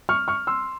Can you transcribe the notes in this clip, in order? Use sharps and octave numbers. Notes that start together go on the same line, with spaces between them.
C#6 F6
C#6 F6
C6 E6